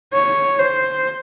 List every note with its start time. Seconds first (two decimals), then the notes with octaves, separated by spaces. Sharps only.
0.13 C#5
0.59 C5